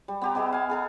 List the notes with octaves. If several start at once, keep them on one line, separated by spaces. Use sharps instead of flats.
G3
B3 G4 A#5
B3 G#4 D#5 E5
F5 G#5
G#4 A4 A#5